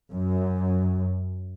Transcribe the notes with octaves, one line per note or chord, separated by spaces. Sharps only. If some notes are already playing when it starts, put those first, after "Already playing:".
F#2